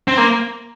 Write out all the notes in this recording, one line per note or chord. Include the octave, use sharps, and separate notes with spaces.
C4
A#3